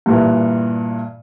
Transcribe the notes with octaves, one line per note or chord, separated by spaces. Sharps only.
G2 A#2 E3